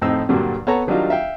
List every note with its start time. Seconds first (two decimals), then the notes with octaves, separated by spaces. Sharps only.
0.01 F2 A2 C4 D#4 E6
0.29 G2 A#2 D3 F#3 G3
0.67 B3 A4 C#5 A5 A#5
0.87 D#3 F#3 G3 D4 D#4 F4
1.10 E5 F5 G5